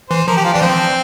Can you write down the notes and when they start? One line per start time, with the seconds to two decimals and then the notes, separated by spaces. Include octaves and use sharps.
0.10 E3 C5
0.28 F3 A#4
0.37 G4
0.45 F4
0.54 E3 D4
0.62 F3 C4